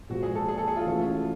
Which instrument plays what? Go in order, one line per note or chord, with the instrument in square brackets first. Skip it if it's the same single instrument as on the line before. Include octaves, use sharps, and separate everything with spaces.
[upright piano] A#2 F3 G#3 [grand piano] F#4
[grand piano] G#4
A4
G#4
A4
G#4
F4
[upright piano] E3 A3 C#4 F#4